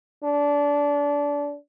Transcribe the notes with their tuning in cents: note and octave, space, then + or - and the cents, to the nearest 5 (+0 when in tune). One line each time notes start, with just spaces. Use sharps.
D4 -25